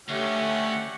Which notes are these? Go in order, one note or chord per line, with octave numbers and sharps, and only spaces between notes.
D2 A3 C#4 G4 F#5